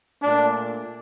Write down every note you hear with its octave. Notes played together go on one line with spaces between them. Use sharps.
A#2 A3 D4